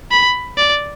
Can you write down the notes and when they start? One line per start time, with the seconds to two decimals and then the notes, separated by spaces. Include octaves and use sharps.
0.11 B5
0.57 D5